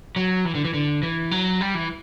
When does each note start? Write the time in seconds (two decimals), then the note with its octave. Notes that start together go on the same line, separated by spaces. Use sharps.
0.16 F#3
0.45 E3
0.55 D3
0.65 E3
0.74 D3
1.03 E3
1.31 F#3
1.61 G3
1.75 E3